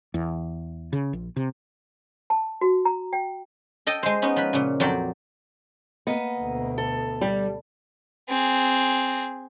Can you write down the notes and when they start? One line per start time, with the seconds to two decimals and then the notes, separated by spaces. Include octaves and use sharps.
0.14 E2
0.93 C#3
1.13 A#1
1.36 C3
2.30 A5
2.61 F#4
2.85 A#5
3.13 G5
3.87 A4 D#5 G5 A5
4.03 G#3 C5
4.22 B3 C#4 D#4
4.36 F3 B4
4.53 A#2 C#3
4.80 F2 F#3 D5 G5
6.07 A#3 B3 D#5
6.40 D2 B2
6.78 A4
7.21 G3
8.29 C4 G#4